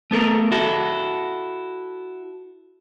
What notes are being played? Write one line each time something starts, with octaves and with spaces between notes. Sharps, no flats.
A3 B3 A4 A#4
E4 F#4 A4